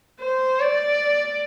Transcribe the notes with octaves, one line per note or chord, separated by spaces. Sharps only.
C5
D5